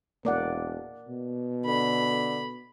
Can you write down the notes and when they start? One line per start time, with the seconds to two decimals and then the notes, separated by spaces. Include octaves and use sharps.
0.25 E1 A#3 D5 F#5
1.08 B2
1.66 D3 B5